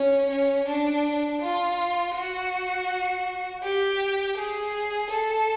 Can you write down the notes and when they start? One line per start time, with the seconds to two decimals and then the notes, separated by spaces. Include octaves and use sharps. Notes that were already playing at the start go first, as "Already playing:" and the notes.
Already playing: C#4
0.31 C#4
0.68 D4
1.42 F4
2.15 F#4
3.63 G4
4.37 G#4
5.10 A4